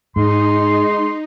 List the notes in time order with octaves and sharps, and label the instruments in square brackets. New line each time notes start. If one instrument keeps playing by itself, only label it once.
[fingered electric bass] G#2 [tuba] G#3 [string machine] D#4 [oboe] C6